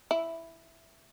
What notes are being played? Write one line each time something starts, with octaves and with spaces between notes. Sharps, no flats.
E4